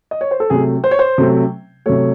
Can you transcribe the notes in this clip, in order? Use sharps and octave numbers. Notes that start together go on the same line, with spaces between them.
D#5
C#5
C5
A4
C3 F#3 A3 G#4
C5
C#5
C5
C3 F#3 A3
C3 F#3 A3 C#5